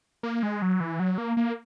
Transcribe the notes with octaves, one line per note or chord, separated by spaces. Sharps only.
A#3
G#3
F#3
E3
F#3
A#3
A#3